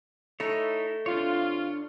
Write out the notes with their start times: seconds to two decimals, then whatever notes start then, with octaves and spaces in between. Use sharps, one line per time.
0.40 A3 D#4 E4 C#5
1.06 C3 D4 F4 C#5